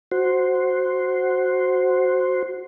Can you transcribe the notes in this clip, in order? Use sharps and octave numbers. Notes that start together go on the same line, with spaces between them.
F#4 C5